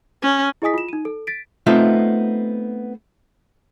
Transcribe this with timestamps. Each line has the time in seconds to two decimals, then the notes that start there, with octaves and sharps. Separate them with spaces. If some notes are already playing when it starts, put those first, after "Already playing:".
0.22 C#4
0.62 E4 G#4 D#5 G#5 D#6 B6
0.74 F4 E7
0.89 D#4 D#7
1.05 A4
1.27 A6 B6 D7
1.66 A3 B3 C4 D#4 F4 E5